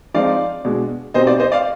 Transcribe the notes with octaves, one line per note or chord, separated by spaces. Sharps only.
F3 G#3 C4 D#4 D5 F5
B2 G#3 D4
B2 G3 C4 D#4 C5 D#5
D5
C5 D#5
D5 F5